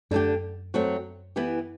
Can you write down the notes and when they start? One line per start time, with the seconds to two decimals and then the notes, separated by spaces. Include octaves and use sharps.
0.11 F#2 D3 A3 D4 G4
0.74 F#3 A3 C4 F#4
1.36 E3 B3 E4 G4